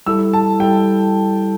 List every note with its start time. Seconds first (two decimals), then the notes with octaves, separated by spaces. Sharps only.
0.06 G3 E4 A4 E6
0.34 A5
0.60 G3 E4 A4 G5